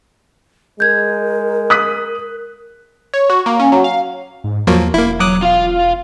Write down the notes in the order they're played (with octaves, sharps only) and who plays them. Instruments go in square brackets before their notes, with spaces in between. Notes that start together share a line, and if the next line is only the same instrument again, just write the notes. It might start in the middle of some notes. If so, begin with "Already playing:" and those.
[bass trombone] G#3 [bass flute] A#4 [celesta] G6 G#6
[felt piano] D#6 F#6 B6
[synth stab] C#5
F#4
A#3
C#4
F#3
F5
[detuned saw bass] G#2
[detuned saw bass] E2 [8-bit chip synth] F3 F#3 A#3
[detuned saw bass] E1 [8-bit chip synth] A#3 E4
[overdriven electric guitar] F#3 [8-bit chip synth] D6 D#6 F#6
[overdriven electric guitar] F4 F5